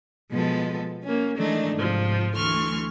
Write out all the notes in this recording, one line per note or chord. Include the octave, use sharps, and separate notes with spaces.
B2 F3 G#3 B3 A4
A#3 C#4
D#3 E3 G#3 A3 D4 D#4
G#2 C3 F3
D2 E3 A3 C6 C#6 F6